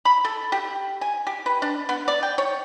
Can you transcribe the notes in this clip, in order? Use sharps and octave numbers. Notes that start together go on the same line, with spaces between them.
B5
A4
G4
G#5
G4
B4
D4
B3
D5
G5
C#5